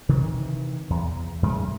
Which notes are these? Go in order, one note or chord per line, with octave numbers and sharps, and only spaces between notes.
C3 D#3 E3
E2
F#2 D#3 G#3 A3